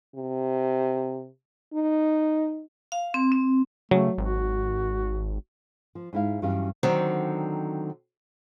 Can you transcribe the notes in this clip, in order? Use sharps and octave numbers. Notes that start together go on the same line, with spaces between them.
C3
D#4
F5
C4
C4
C#3 F#3 A3
G#1 F#4
F3
G#2 E4 F5
G2 E3 F#3 C#4 G4 F5
D3 D#3 F#3 C4